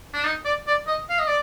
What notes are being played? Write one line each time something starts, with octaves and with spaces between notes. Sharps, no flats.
D4
D#4
D5
D5
D#5
F5
D#5
D5